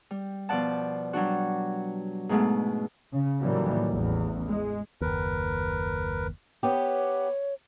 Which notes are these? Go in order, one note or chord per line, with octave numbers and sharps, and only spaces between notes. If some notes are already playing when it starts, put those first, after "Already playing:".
G3
B2 F3 D5 F#5 A5
F#3 G3 D4 F#4
G#2 B2 G#3 A3
C#3
A2 D#3 E3 F#3 G3 A#3
A1 E2
G#3
F#1 D#2 A#4 B4
B3 G4 C#5